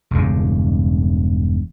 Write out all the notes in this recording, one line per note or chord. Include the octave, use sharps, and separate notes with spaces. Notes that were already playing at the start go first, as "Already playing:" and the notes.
E1 G2 C#3